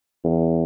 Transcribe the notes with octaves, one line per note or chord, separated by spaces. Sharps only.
E2